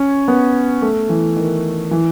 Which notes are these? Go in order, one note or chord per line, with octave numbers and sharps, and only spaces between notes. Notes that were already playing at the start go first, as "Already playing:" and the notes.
Already playing: C#4
B3
A3
E3
D#3
E3